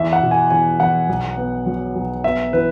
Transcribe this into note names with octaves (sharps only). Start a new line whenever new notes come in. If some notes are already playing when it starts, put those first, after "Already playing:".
Already playing: E2 E5
F#5
B2
G#5
E2 G#5
E2 F#5
B1
B3
F#3
B1
B3 E5
E3 B4